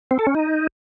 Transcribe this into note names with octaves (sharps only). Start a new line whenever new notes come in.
C4
A4
C#4
D#4